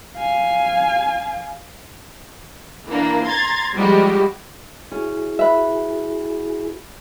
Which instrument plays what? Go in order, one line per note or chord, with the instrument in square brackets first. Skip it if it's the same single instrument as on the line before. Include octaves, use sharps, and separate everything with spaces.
[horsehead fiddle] F5 G#5
[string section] E3 A#3 D4
A#5 C6 G#6 A6
F3 G3 G#3 F#4 G4
[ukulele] C#4 [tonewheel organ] E4 F#4 G#4
[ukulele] B4 E5